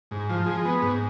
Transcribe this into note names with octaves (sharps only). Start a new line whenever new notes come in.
G#2
F3
G#3
B3
G#2